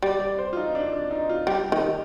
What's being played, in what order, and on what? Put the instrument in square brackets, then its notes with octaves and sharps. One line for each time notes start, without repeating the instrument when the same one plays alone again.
[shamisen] G3 [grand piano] D5
[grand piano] D5
C5
F4
D#4
D4
D4
D#4
F4
[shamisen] G3 [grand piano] G4
[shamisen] D#3